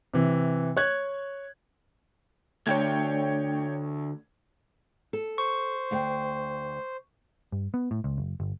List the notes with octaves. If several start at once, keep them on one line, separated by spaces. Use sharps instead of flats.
C3 E3
C#5 F#6 G#6
D2 A3 D4 C#5 G5 G#6
A4
C5 C#6
D2 F5 G5
G2
B3
A2
C#2
F#1
G1